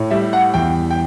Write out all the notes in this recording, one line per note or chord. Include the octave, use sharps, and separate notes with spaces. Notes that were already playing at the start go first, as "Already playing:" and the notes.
Already playing: A2
G3 E5
F#5
E2 G5
G5